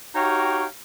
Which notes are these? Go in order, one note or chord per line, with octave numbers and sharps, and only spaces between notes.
D#4 F#4 G4 C#5 F5 G5